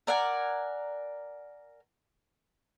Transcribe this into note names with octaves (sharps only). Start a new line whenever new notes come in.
A#4 D5 F#5 G#5